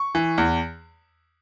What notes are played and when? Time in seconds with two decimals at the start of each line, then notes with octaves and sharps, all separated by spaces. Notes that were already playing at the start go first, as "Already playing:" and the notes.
Already playing: C#6
0.15 E3
0.38 E2